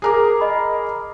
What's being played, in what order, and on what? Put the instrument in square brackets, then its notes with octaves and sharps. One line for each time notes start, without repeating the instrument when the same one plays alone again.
[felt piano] G#4 A#4 D6
[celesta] D#5 B5